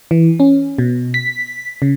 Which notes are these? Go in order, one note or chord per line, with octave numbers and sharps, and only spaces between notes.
E3
C#4
B2
B6
C#3